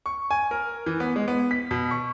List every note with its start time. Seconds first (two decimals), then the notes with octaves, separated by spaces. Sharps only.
0.06 C#6
0.31 G#5
0.51 A#4
0.86 E3
1.00 B3
1.16 G#3
1.28 B3
1.51 B6
1.71 B2
1.91 C#6